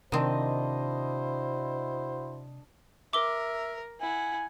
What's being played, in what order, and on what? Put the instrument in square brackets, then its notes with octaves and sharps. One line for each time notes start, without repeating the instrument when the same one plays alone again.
[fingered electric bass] C3 [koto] D#3 C4 [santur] D4 D#5 [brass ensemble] E4 F#4 C5
[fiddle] A#4 [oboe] E5 [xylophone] D6 G7
[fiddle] E4 F#5 [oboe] G#5